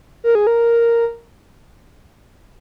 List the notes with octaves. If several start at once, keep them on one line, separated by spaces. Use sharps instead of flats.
A#4
G#4
A#4